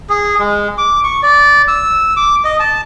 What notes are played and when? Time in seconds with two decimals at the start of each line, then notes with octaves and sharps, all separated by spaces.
0.10 G#4
0.39 G#3
0.78 D6
1.04 C#6
1.23 D5
1.68 E6
2.17 D6
2.45 D#5
2.60 A5